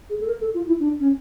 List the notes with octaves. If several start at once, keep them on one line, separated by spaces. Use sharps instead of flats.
G#4
A4
A#4
A4
F4
E4
D4
C#4